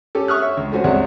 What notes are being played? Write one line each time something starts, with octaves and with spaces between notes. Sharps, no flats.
C#4 G4 A4
E5 C#6 D#6 F6 F#6
C#5 E5
C#2
A3 C#4 F#4 C5
C2 C3 G#3 D4 C#5 F#5